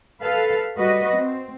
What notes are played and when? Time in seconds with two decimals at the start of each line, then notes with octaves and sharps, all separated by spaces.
0.21 A4 B4 F5
0.76 G3 F#4 B4 D#5
1.14 C4